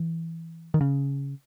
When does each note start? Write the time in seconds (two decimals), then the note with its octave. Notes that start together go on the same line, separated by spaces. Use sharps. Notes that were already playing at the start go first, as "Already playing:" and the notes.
Already playing: E3
0.74 D#3
0.81 C#3